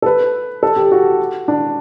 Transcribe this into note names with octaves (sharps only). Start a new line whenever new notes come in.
A4
B4
A4
G4
F#4
D4